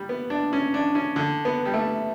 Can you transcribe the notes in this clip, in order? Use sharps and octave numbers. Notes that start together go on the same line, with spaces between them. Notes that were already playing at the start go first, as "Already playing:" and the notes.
Already playing: G3
B3
D4
C#4
D4
C#4
D3
B3
G3
A3